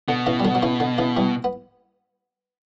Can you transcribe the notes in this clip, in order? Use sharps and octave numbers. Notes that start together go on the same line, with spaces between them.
B2 D3
C#3 E3
G3
D3 F#3
F#3
C#3 E3
D3
C#3 E3
E3 G3
B3